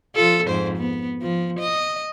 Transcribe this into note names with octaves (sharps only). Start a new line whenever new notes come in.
F3 F4 A4
F2 G#2 C5
B3
F3
D#5